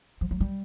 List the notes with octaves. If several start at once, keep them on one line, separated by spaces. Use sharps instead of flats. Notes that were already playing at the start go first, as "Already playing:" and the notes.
F3
F#3
G3